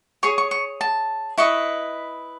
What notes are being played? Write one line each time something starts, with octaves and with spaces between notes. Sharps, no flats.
G#4 C#5 C#6
C#6
C#6
A5
E4 B4 D#5 C#6